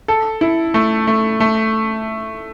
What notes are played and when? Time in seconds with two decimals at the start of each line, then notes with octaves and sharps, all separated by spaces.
0.08 A4
0.41 E4
0.74 A3
1.07 A3
1.40 A3